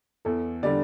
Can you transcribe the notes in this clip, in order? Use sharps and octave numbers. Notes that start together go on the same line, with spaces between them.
E2 A4
D3 G3 D5